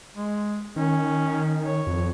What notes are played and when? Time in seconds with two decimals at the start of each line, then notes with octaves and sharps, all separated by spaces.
0.15 G#3
0.76 D#3 C#4
1.66 C#5
1.87 F2